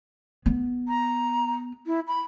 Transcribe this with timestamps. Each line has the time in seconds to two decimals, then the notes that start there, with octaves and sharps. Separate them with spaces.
0.46 B3
0.88 A#5
1.87 E4
2.07 B5